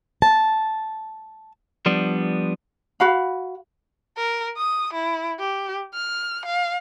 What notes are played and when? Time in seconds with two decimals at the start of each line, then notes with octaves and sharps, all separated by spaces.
0.22 A5
1.86 F3 G3 B3 D4
3.00 F#4 F5 B5
4.17 A#4
4.57 D#6
4.94 E4
5.39 G4
5.94 F6
6.46 F5